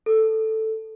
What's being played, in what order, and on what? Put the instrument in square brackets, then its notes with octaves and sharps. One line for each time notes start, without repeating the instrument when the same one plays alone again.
[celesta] A4